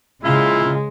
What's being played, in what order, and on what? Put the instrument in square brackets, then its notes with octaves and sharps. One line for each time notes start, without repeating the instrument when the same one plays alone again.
[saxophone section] A#2 F3 F4 [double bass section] C#3 [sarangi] G#3 [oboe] E4